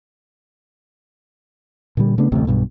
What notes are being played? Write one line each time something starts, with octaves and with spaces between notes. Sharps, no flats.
A#2 D3 G3
C#3 A3 B3 D4
A1 D2 C3 A3
B1 G2 B2